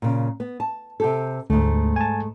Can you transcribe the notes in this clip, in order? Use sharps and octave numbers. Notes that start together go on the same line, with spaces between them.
A#2 C#3
B3
A5
C3 G4 A4
D2 G#2 A3
G#5 A5